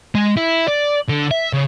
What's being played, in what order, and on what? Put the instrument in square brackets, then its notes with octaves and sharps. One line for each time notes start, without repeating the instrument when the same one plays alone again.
[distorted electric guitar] G#3
E4
D5
D3
E5
C#3